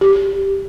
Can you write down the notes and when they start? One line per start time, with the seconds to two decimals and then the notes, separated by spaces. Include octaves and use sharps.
0.01 G4